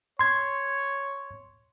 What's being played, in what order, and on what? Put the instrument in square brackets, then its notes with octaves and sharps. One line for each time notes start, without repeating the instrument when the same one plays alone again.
[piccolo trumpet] C#5 [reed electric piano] C6 G#6